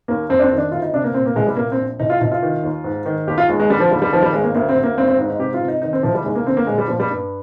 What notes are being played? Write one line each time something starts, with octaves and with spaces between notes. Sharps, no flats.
D#2 A#3
F2 C4
D4
C4
D#3
D4
D2 F4
D#4
C3 D4
A#3
A#2 C4
A#3
C2 G#3
G3
A#2 A#3
C4
A#1
C2 D#4
F4
C2 D#4
F4
D#3
D#2
G#2
D#3
D#2 G4
F4
D#2 G#3
G#3
D3 G3
F3
D#2 G3
G3
D#3 F3
G3
G#1 G#3
A#3
D2 A#3
C4
D2
A#3
G#1 C4
C4
G#2
D#4
C3 G4
F4
C3
D#4
D#3 D#4
C4
C2 F3
G3
D#2 G#3
A#3
D3 C4
A#3
A#1 G#3
G3
A#2 F3
G3
G2